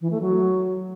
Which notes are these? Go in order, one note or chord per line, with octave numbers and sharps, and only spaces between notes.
E3
A3
F#3